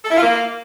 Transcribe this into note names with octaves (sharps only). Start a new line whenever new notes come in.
A4
E4
F4
A#3